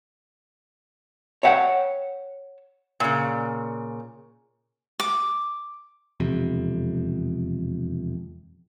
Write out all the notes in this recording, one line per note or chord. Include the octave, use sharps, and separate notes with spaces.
C#5 E5 F#5 G5
A#2 C#3
D6
E1 F2 C3